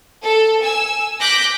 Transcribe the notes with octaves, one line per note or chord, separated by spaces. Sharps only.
A4
G#5 E6
D6 F#6 G6 A#6 B6